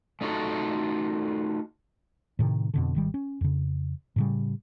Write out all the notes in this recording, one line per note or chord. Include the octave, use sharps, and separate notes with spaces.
A3 D#4 F4 F#4 A4
A2 C3 D#3
F2 B2 D3
G#1 D#3 G3
C#4
F2 C#3
A2 C#3 G3